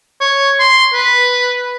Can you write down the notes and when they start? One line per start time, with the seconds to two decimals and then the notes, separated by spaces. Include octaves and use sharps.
0.21 C#5
0.60 C6
0.93 B4